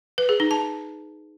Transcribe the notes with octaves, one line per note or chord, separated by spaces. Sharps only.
B4
G#4
D#4
A5